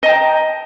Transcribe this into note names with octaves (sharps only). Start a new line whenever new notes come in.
D#5 G5 A5 A#5